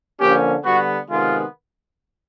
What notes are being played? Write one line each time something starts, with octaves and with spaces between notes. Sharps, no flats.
D3 F3 A#3 C#4 G4
D3 G3 B3 F#4
C3 D#3 G#3 B3 F4